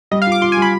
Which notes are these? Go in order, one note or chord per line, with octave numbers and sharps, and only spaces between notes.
G3 D#5
F5
F4 D6
F4 C6
G#5
G3
B5